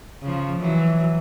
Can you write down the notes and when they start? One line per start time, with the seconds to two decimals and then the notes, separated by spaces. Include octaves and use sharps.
0.22 C#3 F3
0.61 E3 F#3